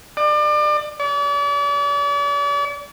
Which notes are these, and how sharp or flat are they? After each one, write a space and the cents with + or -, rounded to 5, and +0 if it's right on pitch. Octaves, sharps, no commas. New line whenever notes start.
D5 +30
D5 -45